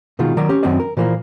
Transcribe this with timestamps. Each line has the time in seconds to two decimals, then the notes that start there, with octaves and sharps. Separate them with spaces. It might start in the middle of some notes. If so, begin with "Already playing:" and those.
0.19 B2 D#3 G#3 F4
0.37 D#3 F#3 A#4 D5 A#5
0.49 C#4 G4
0.63 F#2 D#3 C4 F#4 D5 D#5
0.80 A#4
0.97 A#2 E3 F3 A#3